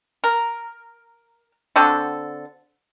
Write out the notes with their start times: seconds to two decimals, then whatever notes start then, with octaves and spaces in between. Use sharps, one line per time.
0.24 A#4
1.76 D3 C4 F#4 A4